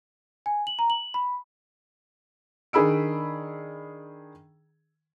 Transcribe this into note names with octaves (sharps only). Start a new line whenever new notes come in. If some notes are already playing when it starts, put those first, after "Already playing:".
G#5
F#7
A#5
F#7
B5
D#3 D4 G#4 B5 E6 D7